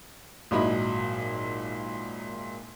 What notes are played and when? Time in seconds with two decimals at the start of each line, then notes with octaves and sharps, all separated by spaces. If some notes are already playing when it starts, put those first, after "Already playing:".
0.51 G#1 A#2 F#3 E4 D#5 B5